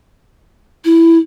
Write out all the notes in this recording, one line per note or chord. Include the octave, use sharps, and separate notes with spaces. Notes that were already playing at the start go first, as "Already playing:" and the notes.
E4